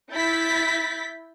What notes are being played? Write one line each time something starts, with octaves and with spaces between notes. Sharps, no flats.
E4 G6 A6 B6